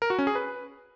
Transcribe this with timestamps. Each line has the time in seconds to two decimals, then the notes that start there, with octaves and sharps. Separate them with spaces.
0.02 A#4
0.10 F#4
0.19 C#4
0.27 G#4
0.35 B4